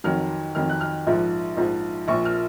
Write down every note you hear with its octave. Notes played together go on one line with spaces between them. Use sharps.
F2 D#3 F#3 F6
F2 D#3 F#3 F6
F#6
F6
A#1 G#2 F3
A#1 G#2 F3
A#1 A#2 F3 C#6
F6